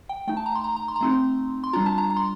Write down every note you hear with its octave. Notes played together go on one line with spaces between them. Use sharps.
G5
A3 D#4 G5
A5
A#5
C6
A#5
A#5
C6
A#5
A3 C4 D#4 C6
C6
G3 D4 F4 A#5
A5
A#5
A#5
C6